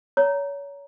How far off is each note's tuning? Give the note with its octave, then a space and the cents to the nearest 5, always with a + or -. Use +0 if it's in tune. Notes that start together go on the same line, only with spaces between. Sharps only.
C#5 +30 A#5 +0